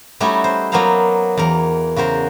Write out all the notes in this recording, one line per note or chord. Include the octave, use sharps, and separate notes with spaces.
G3 A3 C#4 D#4 E4 F#4
C5
F#3 A#3 B3 A#4 C5 F5
E2 A#4
C#3 F#4 A#4 C5